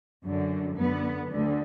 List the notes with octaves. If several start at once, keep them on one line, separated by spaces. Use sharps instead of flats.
F#2 D3
F#2 D3 B3
D2 D3